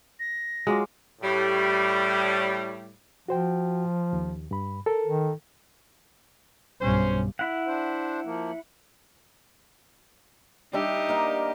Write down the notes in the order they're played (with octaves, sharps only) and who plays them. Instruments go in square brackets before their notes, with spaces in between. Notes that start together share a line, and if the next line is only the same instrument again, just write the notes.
[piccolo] A#6
[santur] F#3 F4 D6 [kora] G#3
[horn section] A2 G3
[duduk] F3 [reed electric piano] F#4 C5 G5
[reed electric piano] D#2
G2 B5
A4 A#4
[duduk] D#3
[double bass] B1 G2 [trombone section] C#4 C5
[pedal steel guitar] E4 F#5
[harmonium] D4 C5
F3 A#3
[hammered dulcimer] G3 D4 E5 [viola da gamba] D#4 G4
[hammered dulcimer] A#3 A#4 D#5